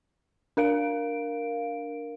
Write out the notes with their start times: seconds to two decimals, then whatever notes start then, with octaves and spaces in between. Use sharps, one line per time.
0.57 D4 A#4 F5 D7